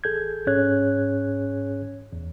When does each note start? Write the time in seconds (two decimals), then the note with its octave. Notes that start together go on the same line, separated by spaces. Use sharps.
0.04 A1 G#4 A4 G6 G#6
0.47 G#2 C#4 G#4 C#5 F#6 G#6
2.13 E2